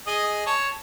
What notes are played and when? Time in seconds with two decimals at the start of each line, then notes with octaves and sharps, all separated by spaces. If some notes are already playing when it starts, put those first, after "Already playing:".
0.07 G#4 D#5
0.46 C#5 A5